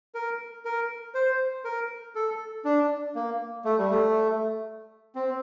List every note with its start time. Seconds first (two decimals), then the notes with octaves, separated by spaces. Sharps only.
0.15 A#4
0.65 A#4
1.15 C5
1.65 A#4
2.15 A4
2.65 D4
3.15 A#3
3.65 A3
3.78 G3
3.90 A3
5.15 C4